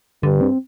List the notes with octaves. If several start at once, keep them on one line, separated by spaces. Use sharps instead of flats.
G2 D3
C4